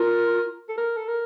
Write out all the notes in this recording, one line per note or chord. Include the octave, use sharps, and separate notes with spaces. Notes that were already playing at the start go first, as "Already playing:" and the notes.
Already playing: F4 A#4
A4
A#4
A4
A#4